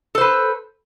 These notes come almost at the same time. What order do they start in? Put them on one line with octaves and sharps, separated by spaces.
A4 C5 B4